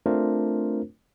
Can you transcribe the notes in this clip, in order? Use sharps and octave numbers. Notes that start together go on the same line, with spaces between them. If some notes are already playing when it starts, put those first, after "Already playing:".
A3 C4 D4 F4 A#4 C5